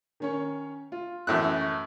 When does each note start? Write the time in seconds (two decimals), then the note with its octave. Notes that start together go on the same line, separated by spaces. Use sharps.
0.20 D#3 C#4 C#5
0.92 F4
1.27 F#2 A2 E3 E4 F#6
1.61 C#6